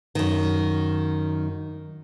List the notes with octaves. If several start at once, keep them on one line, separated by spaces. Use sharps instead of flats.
F#2 D#3